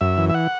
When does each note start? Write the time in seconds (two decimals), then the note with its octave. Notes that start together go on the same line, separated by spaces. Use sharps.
0.01 F#2 E5
0.18 E3
0.29 E5
0.34 F#5